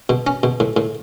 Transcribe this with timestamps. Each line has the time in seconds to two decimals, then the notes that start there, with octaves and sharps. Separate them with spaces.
0.09 B2
0.27 C#4
0.43 B2
0.60 A2
0.77 A2